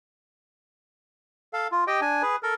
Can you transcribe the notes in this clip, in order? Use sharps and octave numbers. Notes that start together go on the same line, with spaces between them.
A4 F5
F4
G4 D#5 G5
D4 G#5
G#4 B4
A4 A#4